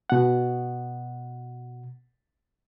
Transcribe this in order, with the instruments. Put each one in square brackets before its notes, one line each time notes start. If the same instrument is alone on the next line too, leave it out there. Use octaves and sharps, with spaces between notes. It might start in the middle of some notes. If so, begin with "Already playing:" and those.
[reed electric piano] B2 F#5